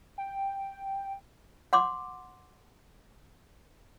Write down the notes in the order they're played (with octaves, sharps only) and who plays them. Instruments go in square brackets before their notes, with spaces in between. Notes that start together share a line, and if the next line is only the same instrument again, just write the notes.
[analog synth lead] G5
[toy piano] F#5 C6 D6